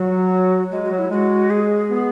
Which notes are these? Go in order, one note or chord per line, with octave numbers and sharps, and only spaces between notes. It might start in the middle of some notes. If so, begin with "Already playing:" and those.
Already playing: F#3 F#4
G#3 F#4
F#4
F#3
E4
G#3 F#4
G#4
B3